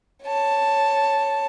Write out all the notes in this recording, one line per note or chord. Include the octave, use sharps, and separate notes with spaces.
C#5 A5